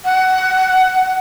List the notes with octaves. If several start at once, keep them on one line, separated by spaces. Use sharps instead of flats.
F#5